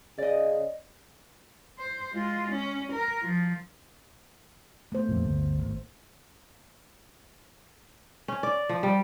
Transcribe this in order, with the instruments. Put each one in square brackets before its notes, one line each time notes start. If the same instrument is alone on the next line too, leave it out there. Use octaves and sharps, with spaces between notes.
[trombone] C#3 [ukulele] D5 D#5
[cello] C5
G#3 F4
C#4
A#4
F3
[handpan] A3 B3 C5
[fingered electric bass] F2 A#2
G1 D2
G#1
[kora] C#4
D5
F3
G3